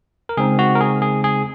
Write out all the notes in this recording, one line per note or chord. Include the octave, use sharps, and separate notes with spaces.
A#4
C#3 G#3 C4 D#4 G#4
F#4
A#4
G#4
G#4
G#4